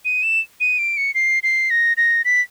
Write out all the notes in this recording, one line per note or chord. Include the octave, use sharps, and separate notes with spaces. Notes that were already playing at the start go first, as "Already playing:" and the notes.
D#7
E7
D#7
D7
C#7
C7
C7
A#6
A#6
B6